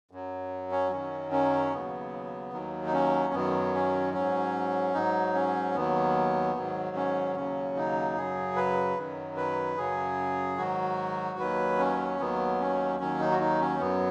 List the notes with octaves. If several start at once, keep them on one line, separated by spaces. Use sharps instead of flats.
F#2 F#3
C#4
F#2 D#3 F#3 C#4
C#4
D#2 C#3 F#3 B3
D#2 D#3 F#3
D#4
C#4
F#2 D#3 F#3 B3
C#4
G#2 F#3 C#4
G#2 F#3 D#4
C#4
D#2 D#3 F#3 B3
G#2 D#3 F#3
C#4
D#2 C#3 F#3 C#4
D#4
F#2 C#3 F#3 G#4
B4
F#2 D#3 F#3
B4
F#2 C#3 F#3 G#4
G#2 D#3 F#3 F#4
D#2 D#3 F#3 B4
C#4
D#2 D#3 F#3 B3
C#4
D#2 D#3 F#3 C#4
D#4
F#4
D#4
C#4
F#2 F#3 B3